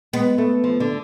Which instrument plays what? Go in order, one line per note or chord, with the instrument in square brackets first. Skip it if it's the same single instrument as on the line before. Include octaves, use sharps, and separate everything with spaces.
[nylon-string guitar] G#3 [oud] B3
[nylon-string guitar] A3
F3
D3